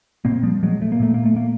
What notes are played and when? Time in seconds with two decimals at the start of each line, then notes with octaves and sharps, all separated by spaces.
0.25 A#2 A#3 C4
0.43 F3 G3
0.63 F#3 G#3
0.82 A3
0.92 A#3
1.00 A#2 A3
1.14 A#3
1.26 A3
1.36 A#3